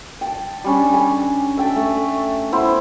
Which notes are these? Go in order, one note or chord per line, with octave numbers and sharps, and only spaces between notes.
G5 A5
G3 C#4 D4
G#5
E5 G5 A5
A3
B3 E4 C5